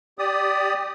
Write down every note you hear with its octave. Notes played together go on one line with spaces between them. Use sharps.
G4 D5 D#6